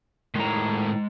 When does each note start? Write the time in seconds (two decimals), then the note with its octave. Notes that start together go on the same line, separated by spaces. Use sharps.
0.35 A2 D#3 G#3 A#5